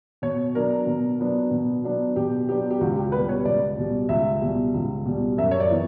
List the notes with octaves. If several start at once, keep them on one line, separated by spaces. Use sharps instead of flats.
B2 C#5
F#3 B3 D4 A#4
B2
F#3 B3 D4
B2
F#3 B3 D4
B2 G4
F#3 B3 D4 G4
G4
C#2 F#4
G4
B2 G3 B4
C#5
C#2 D5
B2 G3
C#2 E5
B2 G3
C#2
B2 G3
F#2 E5
C#5
D5
E3 B3